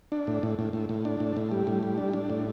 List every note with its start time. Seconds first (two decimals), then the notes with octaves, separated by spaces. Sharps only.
0.12 D4
0.27 A2
0.43 A2
0.59 A2
0.73 A2
0.89 A2
1.05 D4
1.20 A2
1.37 A2
1.51 G3
1.67 A2
1.83 G3
1.98 D4
2.13 D4
2.30 A2